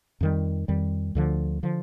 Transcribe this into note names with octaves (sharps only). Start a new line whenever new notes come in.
F2 D#3 G3
F2 D#3 G3
D2 D3 F3
D3 F3